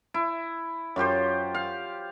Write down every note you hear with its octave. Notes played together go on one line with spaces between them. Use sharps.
E4
F#2 F4 G4 C5
F5